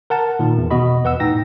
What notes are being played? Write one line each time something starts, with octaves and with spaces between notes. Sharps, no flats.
A#4 F#5 A5
A#2 D#3
E2
B2 F#4 D#5 B5
E2 B4 F#5 E6
A2 D#4 G5 A#6